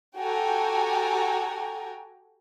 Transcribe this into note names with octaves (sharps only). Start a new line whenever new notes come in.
F#4 G4 A4 G5 G#5 A#5